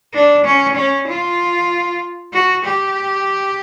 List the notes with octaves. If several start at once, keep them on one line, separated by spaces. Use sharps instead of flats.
D4
C#4
C#4
F4
F#4
G4